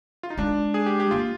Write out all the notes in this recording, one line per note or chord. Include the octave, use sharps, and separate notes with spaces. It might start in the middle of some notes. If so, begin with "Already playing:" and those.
F4
D#4
G#3 D4
G#4
G4
G4
A#3 F4